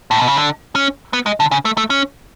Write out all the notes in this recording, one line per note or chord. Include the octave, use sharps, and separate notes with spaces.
A2
B2
C#3
D3
C#4
B3
G#3
D3
C#3
A3
A3
C#4